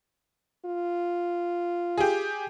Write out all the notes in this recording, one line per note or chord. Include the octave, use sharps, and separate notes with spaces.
F4
G4 G#4